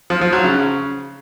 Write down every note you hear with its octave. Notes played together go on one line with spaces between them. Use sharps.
F3
F3
F#3
C#3